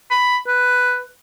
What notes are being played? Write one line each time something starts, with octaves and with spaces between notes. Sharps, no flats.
B5
B4